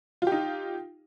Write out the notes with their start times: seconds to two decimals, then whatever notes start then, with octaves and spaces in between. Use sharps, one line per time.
0.22 F4
0.27 G4
0.32 D#4